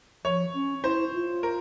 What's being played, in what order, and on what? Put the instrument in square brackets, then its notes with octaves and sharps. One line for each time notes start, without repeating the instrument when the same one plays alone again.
[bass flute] F3 [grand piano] C#5
[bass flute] C#4
[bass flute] E4 [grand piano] C5
[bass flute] F4
[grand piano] A#4